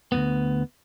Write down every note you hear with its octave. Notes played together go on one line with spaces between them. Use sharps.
D2 G2 B3